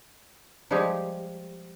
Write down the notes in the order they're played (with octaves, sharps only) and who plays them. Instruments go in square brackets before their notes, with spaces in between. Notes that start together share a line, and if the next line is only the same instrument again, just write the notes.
[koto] F3 G3 G#3 G4 G#4